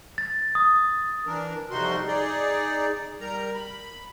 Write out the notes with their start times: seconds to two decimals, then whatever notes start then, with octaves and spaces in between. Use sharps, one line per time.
0.18 A6
0.55 D#6
1.26 E3 D4 A#4
1.71 F2 C3 G3 D#4 F#4 C6
2.07 D#4 G#4 D5
3.21 G3 A#4 A#5
3.55 B5